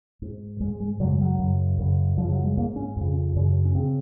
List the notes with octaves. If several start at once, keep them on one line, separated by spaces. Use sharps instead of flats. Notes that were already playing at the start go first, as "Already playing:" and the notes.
G#2
G#2 G#3
G#3
F#2 C#3 F#3
G#3
F#3
F#2 C#3
F#2 C#3
F#2 C#3 F3
F#3
G#3
G#2 A#3
C#4
F2 C#3
F#2 C#3
C#4
C#3 C4